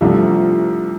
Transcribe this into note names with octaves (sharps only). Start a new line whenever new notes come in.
C2 C3 F3 A3 D4